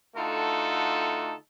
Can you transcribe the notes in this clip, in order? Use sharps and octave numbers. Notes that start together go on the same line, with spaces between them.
D3 A3 D#4 F4 F#4 A4